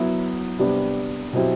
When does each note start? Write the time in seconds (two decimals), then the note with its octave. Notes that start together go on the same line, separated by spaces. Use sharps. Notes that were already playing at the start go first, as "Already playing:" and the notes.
Already playing: F#3 B3 E4
0.59 C3 G3 B3 D4
1.33 B2 F#3 C4 E4 G4